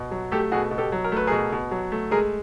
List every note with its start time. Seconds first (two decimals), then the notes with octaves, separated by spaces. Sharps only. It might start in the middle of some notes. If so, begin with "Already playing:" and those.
Already playing: B2
0.11 F#3
0.32 A3 G4 A4
0.52 B2 F#4 G#4
0.71 B2
0.78 G4 A4
0.92 F#3
1.04 A#4
1.12 A3 B4
1.27 B2 G#4 A#4
1.52 B2
1.71 F#3
1.92 A3
2.11 G#3 G#4 A#4